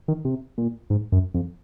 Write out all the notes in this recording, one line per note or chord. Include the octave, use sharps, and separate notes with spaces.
D#3
C3
A#2
G#2
F#2
F2